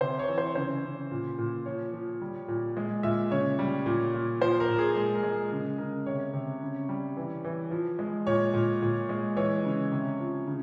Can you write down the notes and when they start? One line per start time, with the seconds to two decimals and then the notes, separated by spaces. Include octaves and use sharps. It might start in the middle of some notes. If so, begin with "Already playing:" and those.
0.01 C3 C5
0.19 C#5
0.28 E3
0.38 C5
0.55 C#3 C5
0.83 C#3
1.11 A#2
1.38 A#2
1.66 F3 C#5
1.93 F3
2.22 G3
2.48 A#2
2.77 G#3
3.03 A#2 E5
3.31 C#3 C#5
3.59 G3
3.86 A#2
4.14 A#2
4.41 F3 C5
4.60 A#4
4.69 A#2
4.79 G#4
4.96 G#3 G#4
5.15 A#4
5.23 G#3
5.51 C#3 G#4
5.78 C#3 A#4
6.06 C3 C#5
6.33 C3
6.62 C#3
6.89 G3
7.17 E3
7.44 E3
7.71 F3
7.99 G#3
8.27 A#2 C#5
8.54 A#2
8.82 A#2
9.09 G#3
9.37 E3 C#5
9.64 C#3
9.92 C3
10.20 F3
10.47 C#3